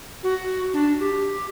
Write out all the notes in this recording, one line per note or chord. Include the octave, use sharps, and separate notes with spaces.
F#4
D4
G4